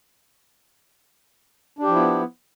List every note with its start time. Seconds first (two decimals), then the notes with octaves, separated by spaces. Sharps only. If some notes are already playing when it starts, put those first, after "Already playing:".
1.79 D4
1.83 G4
1.87 F3
1.92 E4
1.96 B3